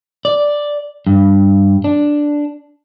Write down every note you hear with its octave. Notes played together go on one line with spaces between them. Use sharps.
D5
G2
D4